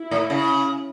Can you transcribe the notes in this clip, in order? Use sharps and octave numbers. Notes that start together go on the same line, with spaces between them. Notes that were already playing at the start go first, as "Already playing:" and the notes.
Already playing: E4
A2
C#3